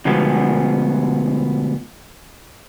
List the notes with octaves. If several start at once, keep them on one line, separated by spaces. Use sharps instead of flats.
D2 B2 F3 G#3 B3